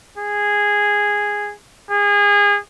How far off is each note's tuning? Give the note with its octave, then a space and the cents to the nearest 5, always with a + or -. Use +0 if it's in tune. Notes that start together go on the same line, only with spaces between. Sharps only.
G#4 -10
G#4 -25